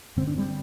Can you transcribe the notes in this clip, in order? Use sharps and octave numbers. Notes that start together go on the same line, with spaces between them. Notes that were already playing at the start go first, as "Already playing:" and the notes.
G2 D3 C4
D4
G3 C4